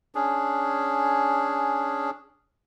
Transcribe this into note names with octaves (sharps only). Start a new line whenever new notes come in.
C#4 D4 G#4